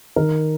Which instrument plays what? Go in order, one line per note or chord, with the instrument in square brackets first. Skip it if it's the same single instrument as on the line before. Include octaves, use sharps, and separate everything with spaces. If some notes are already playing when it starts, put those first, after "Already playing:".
[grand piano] D#3 A#4